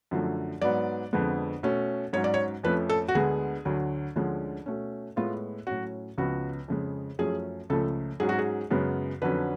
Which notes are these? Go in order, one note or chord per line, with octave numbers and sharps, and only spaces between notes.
F#2 D3 F3 A3
G#2 F#3 B3 D5
F2 D3 G#3 B3
B2 A3 C#4
G#2 F#3 C#4 C#5
D5
C#5
F2 F3 A3 C#4 B4
A4
F#4
D2 D3 G#3 B3 G#4
D2 D3 F#3
D2 D3 F3 G#3 C#4
B2 A3 C#4
A2 G#3 B3 F4
A2 F#3 C#4 F#4
C#2 C#3 F3 B3 F#4
F2 C#3 G#3
F#2 F3 A3 C#4 G#4
C#2 C#3 F3 A3 A4
G#2 F#3 C#4 G#4
F#4
G#4
F#2 C#3 G#3 B3
F2 D3 F#3 C#4 B4